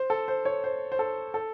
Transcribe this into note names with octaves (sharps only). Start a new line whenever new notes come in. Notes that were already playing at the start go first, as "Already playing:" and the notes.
Already playing: C5
A4
C5
C#5
C5
C5
A4
A4